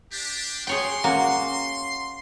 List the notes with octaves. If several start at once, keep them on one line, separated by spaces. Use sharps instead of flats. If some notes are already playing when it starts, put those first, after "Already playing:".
D4 G4
G#4 C#5 G5 C6
A#3 C#4 F#4